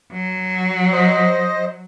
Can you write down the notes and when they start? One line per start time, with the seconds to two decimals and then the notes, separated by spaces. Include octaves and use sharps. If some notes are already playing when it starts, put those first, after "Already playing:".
0.12 F#3
0.92 C5 D#5